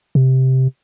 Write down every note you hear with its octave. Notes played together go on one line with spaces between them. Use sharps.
C3